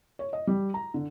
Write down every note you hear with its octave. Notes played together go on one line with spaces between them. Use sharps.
C#5
D#5
G3
A#5
D3